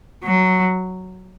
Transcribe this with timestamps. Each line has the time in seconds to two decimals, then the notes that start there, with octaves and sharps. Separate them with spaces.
0.24 F#3